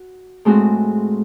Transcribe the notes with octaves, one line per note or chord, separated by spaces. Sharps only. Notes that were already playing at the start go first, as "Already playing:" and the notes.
Already playing: F#4
A2 G#3 C4 F#4